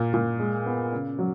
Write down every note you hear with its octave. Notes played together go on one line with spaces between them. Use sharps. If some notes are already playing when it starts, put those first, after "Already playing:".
Already playing: A#2
A#2
G#3
B3
C#3
F#3